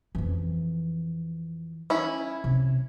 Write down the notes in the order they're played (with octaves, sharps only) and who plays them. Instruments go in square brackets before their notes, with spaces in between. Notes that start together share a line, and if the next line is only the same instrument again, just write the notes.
[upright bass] F2 E3
[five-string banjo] C#4 E4
[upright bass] C3